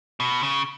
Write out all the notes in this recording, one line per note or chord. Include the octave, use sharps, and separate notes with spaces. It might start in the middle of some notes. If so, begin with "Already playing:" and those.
B2
C#3